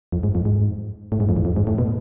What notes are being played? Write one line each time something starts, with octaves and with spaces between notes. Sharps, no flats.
F2
G#2
F2
G#2
A2
G#2
F2
E2
F2
G#2
A2
B2